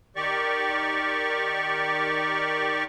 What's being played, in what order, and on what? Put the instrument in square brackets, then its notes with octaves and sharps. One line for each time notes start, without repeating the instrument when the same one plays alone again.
[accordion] D#3 G4 D5 C#6